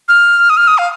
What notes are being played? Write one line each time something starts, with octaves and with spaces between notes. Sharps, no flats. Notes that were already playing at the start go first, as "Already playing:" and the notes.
F6
D#6
F6
D#6
F5